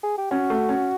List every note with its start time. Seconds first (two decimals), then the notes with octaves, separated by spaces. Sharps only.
0.03 G#4
0.18 G4
0.31 C#4 F#4
0.50 A3
0.69 C#4